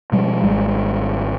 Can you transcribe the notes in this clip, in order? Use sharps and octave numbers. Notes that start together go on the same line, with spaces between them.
B2 F3 G3 G#3
G#1 G3 G#3